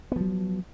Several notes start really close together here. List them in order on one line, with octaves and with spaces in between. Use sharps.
B3 F3 F#3